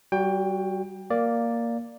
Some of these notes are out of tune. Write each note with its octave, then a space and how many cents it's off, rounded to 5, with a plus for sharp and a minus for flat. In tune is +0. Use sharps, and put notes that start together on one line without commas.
G3 -30 F#4 +0 G5 +20
A#3 +0 D5 +0